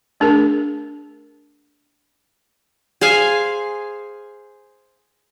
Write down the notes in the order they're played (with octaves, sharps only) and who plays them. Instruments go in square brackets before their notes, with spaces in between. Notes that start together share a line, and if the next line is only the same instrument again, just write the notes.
[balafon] A3 D4 G#4 A#4
[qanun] G#4 C5 F5 G#5